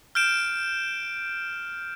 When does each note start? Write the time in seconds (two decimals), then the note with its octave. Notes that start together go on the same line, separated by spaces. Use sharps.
0.15 F6 G6 D7 E7